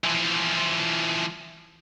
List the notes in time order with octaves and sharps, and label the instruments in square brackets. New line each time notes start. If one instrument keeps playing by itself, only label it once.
[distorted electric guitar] E3 F3